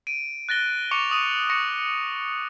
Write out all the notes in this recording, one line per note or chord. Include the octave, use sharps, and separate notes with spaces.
D7 D#7
F#6 A6 A#6 G7
C#6 D6 C#7 F7
C#6 D#6 D#7 F7
C#6 A#6 C#7